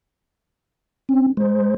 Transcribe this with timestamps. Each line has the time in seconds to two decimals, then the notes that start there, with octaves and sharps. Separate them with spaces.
1.09 C4 C#4
1.37 G#3 C5